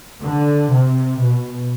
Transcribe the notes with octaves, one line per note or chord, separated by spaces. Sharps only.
D3
C3
B2